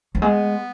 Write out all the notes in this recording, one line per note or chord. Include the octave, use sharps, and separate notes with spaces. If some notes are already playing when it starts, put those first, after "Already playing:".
F#3
G#3 B3